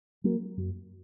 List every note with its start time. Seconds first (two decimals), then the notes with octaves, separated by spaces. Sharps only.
0.24 F#3 A#3
0.57 F#2